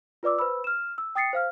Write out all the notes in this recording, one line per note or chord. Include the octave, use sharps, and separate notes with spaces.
F4 B4 D5 D6 E6
B4 C5 B5 E6
F6 E7
E6
G5 D#6 A6 C7 C#7
C5 F5 F6